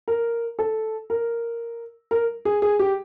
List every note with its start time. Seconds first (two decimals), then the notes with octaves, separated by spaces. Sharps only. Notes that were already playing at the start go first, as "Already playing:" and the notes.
0.08 A#4
0.59 A4
1.10 A#4
2.11 A#4
2.45 G#4
2.62 G#4
2.79 G4